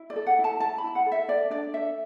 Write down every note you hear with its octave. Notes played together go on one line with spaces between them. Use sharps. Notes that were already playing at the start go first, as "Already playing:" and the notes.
Already playing: E4
D5
A4
F#5
E4
A5
E4 A5
B5
E4
F#5
A4
E5
A4 D5
D4 D5
A4 E5